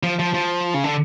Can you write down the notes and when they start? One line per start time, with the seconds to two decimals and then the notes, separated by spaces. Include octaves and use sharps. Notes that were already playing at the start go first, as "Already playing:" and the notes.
0.03 F3
0.19 F3
0.34 F3
0.74 C#3
0.84 D3